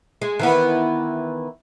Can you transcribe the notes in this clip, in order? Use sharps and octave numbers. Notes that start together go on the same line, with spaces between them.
G#3
D#3 E3 B3